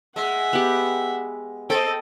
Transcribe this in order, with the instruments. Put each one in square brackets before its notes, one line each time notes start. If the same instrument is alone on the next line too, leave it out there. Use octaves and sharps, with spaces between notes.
[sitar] G#3 [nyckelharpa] E5 F#5
[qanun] B3 G4
[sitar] C4 [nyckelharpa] A4 D#5 [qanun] G5